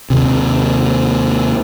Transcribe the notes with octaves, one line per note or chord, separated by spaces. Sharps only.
D#2 C3